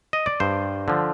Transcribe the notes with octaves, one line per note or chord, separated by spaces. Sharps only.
D#5
D5
G2 C5
D3 F3